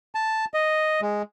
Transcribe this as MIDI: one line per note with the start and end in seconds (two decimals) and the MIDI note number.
0.15 0.45 81
0.54 1.01 75
1.01 1.22 56